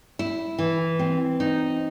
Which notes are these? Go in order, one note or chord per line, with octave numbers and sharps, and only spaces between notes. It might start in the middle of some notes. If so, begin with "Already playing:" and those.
E4
E3
C4
D#4